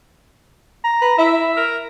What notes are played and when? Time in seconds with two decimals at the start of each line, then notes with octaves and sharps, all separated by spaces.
0.84 A#5
1.02 B4
1.18 E4 E5
1.57 A#4